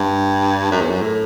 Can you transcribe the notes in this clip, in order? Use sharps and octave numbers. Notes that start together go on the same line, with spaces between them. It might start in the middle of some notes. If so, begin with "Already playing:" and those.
Already playing: G2
F#2
E2
F#2
A2